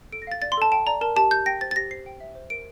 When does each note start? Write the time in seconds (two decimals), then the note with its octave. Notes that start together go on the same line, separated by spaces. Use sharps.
0.12 A4 D7
0.22 A#6
0.27 F5 A6
0.42 D5 A6
0.52 C6
0.58 A4 A5
0.72 G5 A5
0.87 D5 A#5
1.01 A#4 A5
1.16 G4 A5
1.31 G4 G6
1.46 G5 A#6
1.61 C5 A6
1.71 A6
1.76 G4 A#6
1.91 C5 C7
2.06 G5
2.21 E5
2.35 C5
2.50 A#4 D7